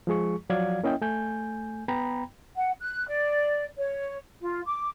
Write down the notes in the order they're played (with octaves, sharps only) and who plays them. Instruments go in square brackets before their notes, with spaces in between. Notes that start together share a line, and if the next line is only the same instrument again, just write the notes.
[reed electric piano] F3 G#3 G#4 C#6
F3 F#3 F#4 D5 F5 G#6
A#3 C#4 E4 D#5 G5
A3 G#5 G6
B3 G5 A#5 B5
[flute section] F#5
F#6
D5
C#5
F4
D6